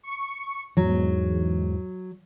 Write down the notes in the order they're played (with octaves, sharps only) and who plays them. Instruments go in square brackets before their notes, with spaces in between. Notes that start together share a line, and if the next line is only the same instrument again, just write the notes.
[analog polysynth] C#6 C#7
[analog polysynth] E2 G#2 [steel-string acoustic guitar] F#3